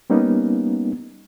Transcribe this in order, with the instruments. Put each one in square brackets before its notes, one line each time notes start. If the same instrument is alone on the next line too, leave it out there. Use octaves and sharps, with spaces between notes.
[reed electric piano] G3 A#3 B3 C#4 D#4